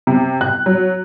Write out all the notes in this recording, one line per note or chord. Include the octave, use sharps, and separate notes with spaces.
C3
F#6
F#3